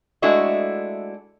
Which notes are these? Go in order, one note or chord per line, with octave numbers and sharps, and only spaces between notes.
G#3 A3 D4 E4 F#4 D#5